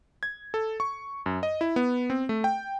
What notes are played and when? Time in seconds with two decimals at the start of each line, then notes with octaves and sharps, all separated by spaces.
0.23 G#6
0.54 A4
0.80 C#6
1.26 F#2
1.43 D#5
1.61 E4
1.76 B3
2.10 C4
2.29 A3
2.44 G5